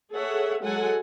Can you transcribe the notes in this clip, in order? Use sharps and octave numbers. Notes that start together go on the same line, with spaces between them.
G#4 A4 C#5 E5 F#5
F#3 G#3 A4 F#5 G#5